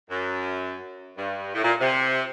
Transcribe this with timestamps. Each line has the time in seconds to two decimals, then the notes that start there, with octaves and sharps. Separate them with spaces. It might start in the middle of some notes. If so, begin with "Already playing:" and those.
0.10 F#2
1.18 G2
1.55 A2
1.64 A#2
1.81 C3